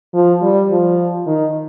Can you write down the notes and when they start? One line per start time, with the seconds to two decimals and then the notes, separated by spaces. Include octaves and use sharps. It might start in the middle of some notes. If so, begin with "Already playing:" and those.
0.14 F3
0.42 G3
0.70 F3
1.26 D#3